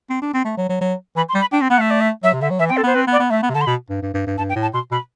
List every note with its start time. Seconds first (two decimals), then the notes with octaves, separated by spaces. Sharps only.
0.10 C4
0.22 D4
0.34 C4
0.45 A3
0.57 F#3
0.69 F#3
0.81 F#3
1.16 E3 B5
1.29 C6
1.34 G3
1.41 B5
1.52 D4 G5
1.62 C4
1.70 B3 F#5
1.79 A3 E5
1.91 D5
2.01 E5
2.24 F#3 E5
2.33 C3
2.41 D3 E5
2.50 F#3
2.59 E3 E5
2.69 G5
2.72 C4
2.77 A4
2.83 B3
2.87 C5
2.95 C4 B4
3.07 B3
3.12 D5
3.19 B3
3.30 A3 E5
3.43 B3
3.50 C3
3.55 D3 A5
3.61 C6
3.67 B2 B5
3.90 G2
4.02 G2
4.14 G2
4.27 G2
4.38 G2 A5
4.49 G5
4.56 A2
4.62 A5
4.73 B2 C6
4.91 B2 B5